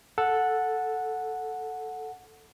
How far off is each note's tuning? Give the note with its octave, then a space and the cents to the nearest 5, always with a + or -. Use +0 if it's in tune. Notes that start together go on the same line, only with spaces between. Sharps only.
A4 +0 F#5 -10